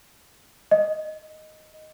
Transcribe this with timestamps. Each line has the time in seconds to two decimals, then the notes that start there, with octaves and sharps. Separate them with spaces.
0.71 D#5